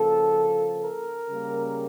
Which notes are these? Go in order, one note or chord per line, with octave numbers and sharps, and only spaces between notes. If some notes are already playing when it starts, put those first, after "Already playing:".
Already playing: C#3 F3 A#3 A4
A#4
C#3 G3 A#3